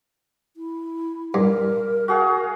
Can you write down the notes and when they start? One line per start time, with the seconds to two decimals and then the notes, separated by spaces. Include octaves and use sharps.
0.57 E4
1.34 G2 A#4
2.08 F#4 G#4 F5